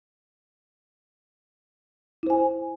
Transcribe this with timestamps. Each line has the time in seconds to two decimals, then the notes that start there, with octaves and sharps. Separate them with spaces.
2.23 E4
2.27 C5
2.30 G#5